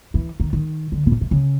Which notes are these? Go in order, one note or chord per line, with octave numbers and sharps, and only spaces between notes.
E3
D#3
D#3
D3
A#2
B2
C3
C#3